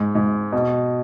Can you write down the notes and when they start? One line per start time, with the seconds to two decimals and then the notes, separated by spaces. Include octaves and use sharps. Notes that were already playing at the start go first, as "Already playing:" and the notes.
Already playing: G#2
0.15 G#2
0.52 B2